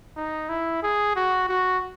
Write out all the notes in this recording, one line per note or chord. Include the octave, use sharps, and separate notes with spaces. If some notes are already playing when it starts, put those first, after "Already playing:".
D#4
E4
G#4
F#4
F#4